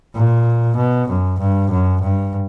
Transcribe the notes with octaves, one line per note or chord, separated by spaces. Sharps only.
A#2
B2
F#2
G2
F#2
G2